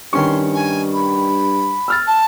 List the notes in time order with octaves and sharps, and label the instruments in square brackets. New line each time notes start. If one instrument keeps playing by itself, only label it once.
[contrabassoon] G2 [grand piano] D#3 C#4 C#6 [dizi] C6
[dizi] G#5
B5
[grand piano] E6 F6 A6
[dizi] A5